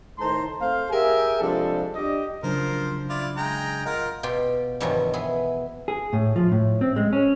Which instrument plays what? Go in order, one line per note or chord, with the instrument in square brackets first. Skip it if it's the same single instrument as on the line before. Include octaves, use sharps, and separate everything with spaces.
[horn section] A2 D#3 C5 A5 A#5 C6
A3 C4 C5 F5
G4 G#4 A#4 E5 G5 G#5
C3 F3 G3 G#3 D4 A4
D4 G4 D#5
[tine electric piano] C#3 F#3 D4 [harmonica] F3 A#4 C5
[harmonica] E4 F4 D5
G#3 G5 A#5
[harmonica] F4 A#4 [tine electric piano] D#5 F#5
[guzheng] B2 F4 G4 G5
E2 G2 B2 D#3 F3 F#3
B3 E4 G#4
[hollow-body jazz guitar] G#4
A2
F3
A2
C4
G#3
C#4